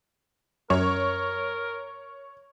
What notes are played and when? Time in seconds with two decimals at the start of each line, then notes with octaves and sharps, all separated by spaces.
0.70 F#2 A#4 C#5